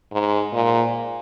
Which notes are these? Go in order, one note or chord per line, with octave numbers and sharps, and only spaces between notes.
G#2
A#2